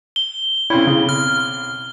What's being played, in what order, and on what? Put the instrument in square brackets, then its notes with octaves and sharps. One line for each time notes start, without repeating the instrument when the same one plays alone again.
[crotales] G7
[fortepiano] B1 C4 C#4 [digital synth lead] E4
[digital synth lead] C#3
F6